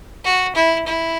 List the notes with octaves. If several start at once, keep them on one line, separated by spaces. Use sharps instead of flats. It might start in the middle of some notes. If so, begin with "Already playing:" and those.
F#4
E4
E4